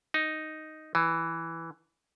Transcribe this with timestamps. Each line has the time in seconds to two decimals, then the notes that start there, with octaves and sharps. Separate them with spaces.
0.14 D#4
0.95 E3